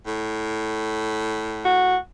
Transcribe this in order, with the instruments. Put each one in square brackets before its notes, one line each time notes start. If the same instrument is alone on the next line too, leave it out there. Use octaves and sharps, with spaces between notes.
[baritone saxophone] A2
[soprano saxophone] F#4